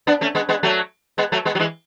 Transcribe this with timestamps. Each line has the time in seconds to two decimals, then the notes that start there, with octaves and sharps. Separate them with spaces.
0.07 B3 D4
0.21 A3 C#4
0.35 G#3 B3
0.49 G#3 B3
0.63 F#3 A3
1.18 G#3 B3
1.32 F#3 A3
1.45 G#3 B3
1.55 F#3
1.59 E3 G#3